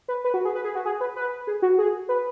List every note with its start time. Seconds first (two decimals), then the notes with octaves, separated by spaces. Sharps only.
0.08 B4
0.24 B4
0.34 F#4
0.45 G#4
0.55 B4
0.65 G#4
0.75 F#4
0.85 G#4
1.01 B4
1.16 B4
1.47 G#4
1.62 F#4
1.78 G#4
2.09 B4